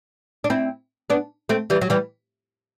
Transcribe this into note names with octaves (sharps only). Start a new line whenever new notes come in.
D4
C4 E4
B3 D4
A3 C4
E3 G3
F#3
E3 G3